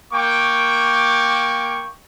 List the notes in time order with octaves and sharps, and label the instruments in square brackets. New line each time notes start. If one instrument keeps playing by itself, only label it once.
[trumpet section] A#3 G5 C#6 D6